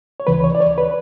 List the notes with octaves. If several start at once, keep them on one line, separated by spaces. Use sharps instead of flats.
C#5
D2 C#3 E3 B4
C#5
D5
C#5
B4